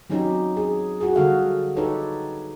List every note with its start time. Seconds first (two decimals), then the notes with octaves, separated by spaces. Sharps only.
0.10 F#3 C4 C#4 D#4 G4
0.57 G#4
1.01 F#4 G#4
1.16 D3 G3 F#4 A4 F5
1.76 D4 D#4 G4 A4 B4 C#5